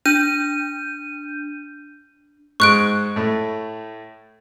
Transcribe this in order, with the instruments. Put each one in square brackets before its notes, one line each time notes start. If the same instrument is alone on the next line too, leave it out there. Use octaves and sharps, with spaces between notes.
[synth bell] D4 G6 D#7
[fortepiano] G#2 G#3 [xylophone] C#6 F#6 D7
[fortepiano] A2 A3